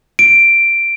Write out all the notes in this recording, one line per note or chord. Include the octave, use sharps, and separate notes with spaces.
D7